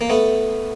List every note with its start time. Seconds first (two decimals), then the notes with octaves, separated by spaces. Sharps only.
0.01 A#3
0.10 A3 B3